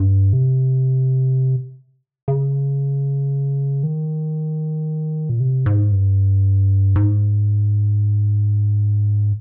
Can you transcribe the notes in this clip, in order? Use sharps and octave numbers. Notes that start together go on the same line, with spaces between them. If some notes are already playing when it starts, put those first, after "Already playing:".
Already playing: G2
C3
C#3
D#3
A#2
C3
G#2
G2
G#2